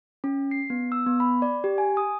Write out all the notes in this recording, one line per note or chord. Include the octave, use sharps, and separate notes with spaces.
C#4
C7
B3
E6
B3
B5
D5
G4
G#5
D#6